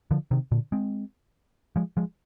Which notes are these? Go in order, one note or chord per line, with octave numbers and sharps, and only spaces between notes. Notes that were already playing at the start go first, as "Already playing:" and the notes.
D3 F3
C3 D#3
A#2 D3
G#3 C4
F3 G#3
F3 G#3